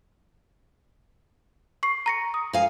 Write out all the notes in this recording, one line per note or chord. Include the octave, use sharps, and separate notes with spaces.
C#6 C7
A#5 A#6 C#7
D#6
F5 G#5